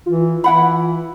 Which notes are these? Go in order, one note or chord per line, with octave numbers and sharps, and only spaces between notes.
E3 F4
E3 E4 F#5 B5